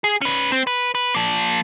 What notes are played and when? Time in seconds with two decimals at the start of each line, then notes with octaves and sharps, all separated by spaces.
0.04 G#4
0.21 C#4 B4
0.52 C4
0.67 B4
0.95 B4
1.15 F3 A#3